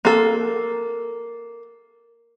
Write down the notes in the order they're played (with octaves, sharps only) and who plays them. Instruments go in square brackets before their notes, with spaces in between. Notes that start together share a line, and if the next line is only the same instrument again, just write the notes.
[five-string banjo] A#3 A4